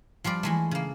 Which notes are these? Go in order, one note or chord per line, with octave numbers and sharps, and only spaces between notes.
F3 G3 F4 D5
E3 G#3 A3
C#3 A#3